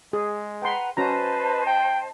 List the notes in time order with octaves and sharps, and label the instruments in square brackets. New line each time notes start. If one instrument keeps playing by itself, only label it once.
[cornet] G#3 [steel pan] G#4
[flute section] B4 F#5 A#5 [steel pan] G5 C6
[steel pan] C#4 F#4 A#5 [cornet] B4 [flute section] C5 D#5 A5
[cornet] G5